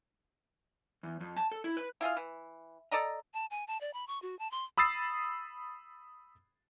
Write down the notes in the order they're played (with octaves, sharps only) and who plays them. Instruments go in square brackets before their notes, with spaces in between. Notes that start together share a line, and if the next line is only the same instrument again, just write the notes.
[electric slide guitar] E2
F2
A5
A4
E4
B4
[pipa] E4 F4 G#4 F5
E3
A4 D5 D#5 A#5
[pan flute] A5
G#5
A5
D5
B5
C#6
F#4
A5
C6
[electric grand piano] B5 D#6 E6 A6 C7